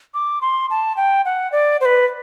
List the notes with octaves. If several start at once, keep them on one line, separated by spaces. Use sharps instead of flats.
D6
C6
A5
G5
F#5
D5
C5
B4